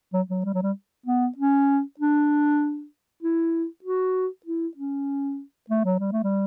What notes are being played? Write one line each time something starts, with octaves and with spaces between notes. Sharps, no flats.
F#3
F#3
G3
F#3
G3
B3
C#4
D4
E4
F#4
E4
C#4
A3
F#3
G3
A3
G3